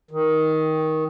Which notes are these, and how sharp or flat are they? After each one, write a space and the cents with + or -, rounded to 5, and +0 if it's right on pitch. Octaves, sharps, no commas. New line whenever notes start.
D#3 +15